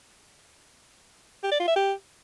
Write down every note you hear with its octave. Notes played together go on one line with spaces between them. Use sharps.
G4
D5
F4
E5
G4